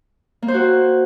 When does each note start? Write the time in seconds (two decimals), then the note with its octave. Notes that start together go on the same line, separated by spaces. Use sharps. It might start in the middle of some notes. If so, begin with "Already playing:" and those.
0.42 A#3
0.48 C5
0.54 F#4